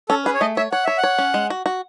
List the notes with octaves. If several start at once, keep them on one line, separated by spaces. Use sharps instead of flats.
C#4 A4
G#4 B4
C#5
A3 D#5
C#5 E5
C#5 F#5
C#5 E5
F#5
C#5
C#4
G#3
F#4
F#4